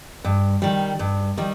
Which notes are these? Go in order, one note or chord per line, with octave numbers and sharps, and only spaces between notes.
G2
D#3 G3
G2
D#3 G3